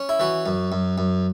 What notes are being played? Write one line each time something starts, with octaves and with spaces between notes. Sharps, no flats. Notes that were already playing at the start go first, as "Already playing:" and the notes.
Already playing: C#4
E4
E3 F#4
F#2
F#2
F#2